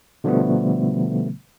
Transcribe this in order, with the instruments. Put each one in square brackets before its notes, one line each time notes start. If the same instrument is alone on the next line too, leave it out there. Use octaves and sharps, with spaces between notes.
[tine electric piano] B2 D3 F3 G3 A3 B3